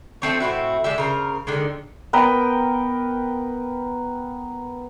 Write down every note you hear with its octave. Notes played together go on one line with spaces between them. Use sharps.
F3 A3 C4 C#5
A2 C4 E4 F#4
G#3 D4 G4 E5
C#3 A#4 C5
D3 D#3 G#3
B3 A#4 B4 G5